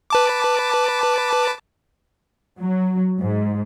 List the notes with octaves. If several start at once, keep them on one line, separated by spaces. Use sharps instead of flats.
B4 A5 D6
F#3
G#2